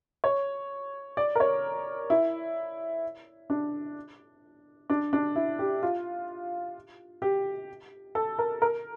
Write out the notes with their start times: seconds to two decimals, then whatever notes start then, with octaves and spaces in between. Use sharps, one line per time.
0.24 C#5
1.17 D5
1.35 A#4
1.40 C#5
2.10 E4
3.50 D4
4.90 D4
5.13 D4
5.36 E4
5.59 G4
5.83 F4
7.22 G4
8.15 A4
8.39 A#4
8.62 A#4